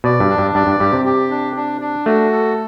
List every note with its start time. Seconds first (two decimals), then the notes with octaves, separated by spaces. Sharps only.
0.04 B2 D5
0.20 G2
0.29 D4
0.38 G2
0.55 G2 D5
0.67 G2
0.80 G2 G4
0.93 C3
1.05 G4
1.30 D4
1.56 D4
1.81 D4
2.06 A3 F#4
2.32 A4